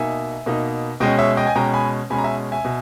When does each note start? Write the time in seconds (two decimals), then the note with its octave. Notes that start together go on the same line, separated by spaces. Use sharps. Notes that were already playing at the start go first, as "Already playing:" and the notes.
Already playing: B2 A#3 D#4 E5 G#5
0.46 B2 A#3 D#4
1.00 B2 G#3 C#4 D#5 G5
1.18 C#5 E5
1.37 D#5 G5
1.47 G#5
1.55 B2 G#3 C#4 G5 A#5
1.74 G#5 B5
2.10 B2 G#3 C#4 G#5 B5
2.18 A#5
2.24 E5 G#5
2.52 E5 G#5
2.65 B2